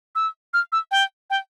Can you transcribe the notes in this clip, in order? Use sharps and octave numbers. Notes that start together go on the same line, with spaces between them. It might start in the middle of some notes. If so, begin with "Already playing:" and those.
E6
F6
E6
G5
G5